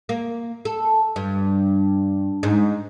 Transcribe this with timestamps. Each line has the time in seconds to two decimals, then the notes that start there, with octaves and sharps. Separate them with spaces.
0.09 A#3
0.65 A4
1.16 G2
2.43 G#2